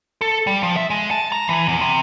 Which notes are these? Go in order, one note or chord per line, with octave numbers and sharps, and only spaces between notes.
A4
G3
F3
E5
G#3
A5
A#5
E3
E2
C3